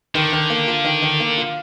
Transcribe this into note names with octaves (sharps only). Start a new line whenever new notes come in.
D3 D#3
D#3
A#3
F4
D#3
D#3
A#3
F4